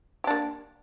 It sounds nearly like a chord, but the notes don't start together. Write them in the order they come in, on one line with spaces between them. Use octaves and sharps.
G4 D4 A#3